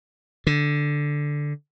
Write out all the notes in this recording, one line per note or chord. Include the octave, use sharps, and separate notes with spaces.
D3